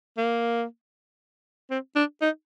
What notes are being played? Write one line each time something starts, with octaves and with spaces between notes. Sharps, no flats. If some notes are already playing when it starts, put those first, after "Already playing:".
A#3
C4
D4
D#4